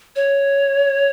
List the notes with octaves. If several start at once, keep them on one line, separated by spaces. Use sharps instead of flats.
C#5